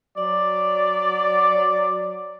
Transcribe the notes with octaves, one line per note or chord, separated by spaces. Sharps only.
F#3 D5